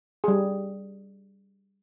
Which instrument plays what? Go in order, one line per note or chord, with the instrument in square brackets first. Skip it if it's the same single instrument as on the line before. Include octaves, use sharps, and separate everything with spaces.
[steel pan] G3 G#4